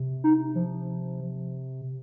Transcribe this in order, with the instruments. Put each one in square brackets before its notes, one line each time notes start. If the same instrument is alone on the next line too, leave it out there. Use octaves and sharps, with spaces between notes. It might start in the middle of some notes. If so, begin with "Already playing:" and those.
Already playing: [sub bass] C3
[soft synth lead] D#4
F3